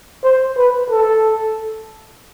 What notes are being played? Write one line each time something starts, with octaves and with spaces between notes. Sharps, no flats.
C5
B4
A4